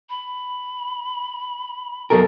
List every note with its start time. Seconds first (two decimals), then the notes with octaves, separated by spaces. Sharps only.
0.10 B5
2.10 F#2 B2 A4 A#4 D#5